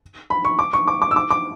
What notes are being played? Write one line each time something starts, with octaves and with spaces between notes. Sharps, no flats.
B5
C#6
D6
C#6
D6
D6
E6
D6
D6